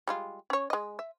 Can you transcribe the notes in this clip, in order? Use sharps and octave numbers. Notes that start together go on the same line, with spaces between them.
G3 G#3 F4
C#4 C#5
G#3 D#5
E5